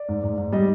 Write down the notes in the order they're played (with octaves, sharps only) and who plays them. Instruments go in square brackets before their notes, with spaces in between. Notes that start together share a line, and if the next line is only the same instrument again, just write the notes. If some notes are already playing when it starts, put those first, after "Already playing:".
Already playing: [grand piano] D5
G#2
G#2
G#2
G3 D#5